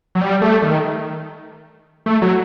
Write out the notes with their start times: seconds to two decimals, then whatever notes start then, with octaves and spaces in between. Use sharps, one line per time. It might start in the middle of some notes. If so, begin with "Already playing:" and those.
0.15 F#3
0.21 G3
0.42 A3
0.62 D#3
2.06 A3
2.22 F#3